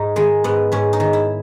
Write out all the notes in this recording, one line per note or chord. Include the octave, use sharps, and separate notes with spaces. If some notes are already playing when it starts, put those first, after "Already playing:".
Already playing: G#2 D#4
D#3 G#3
G#2 B3
G#2 C#4
D#4
D#3
E4